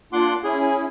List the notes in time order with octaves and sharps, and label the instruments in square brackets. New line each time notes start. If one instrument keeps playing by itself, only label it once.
[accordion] A#3 D4 F4 [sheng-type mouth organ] F#5 C6 D6
[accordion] C#4 E4 [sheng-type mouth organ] G#4